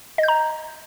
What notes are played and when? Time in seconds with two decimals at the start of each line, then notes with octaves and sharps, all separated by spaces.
0.18 D#5
0.23 G6
0.28 A#5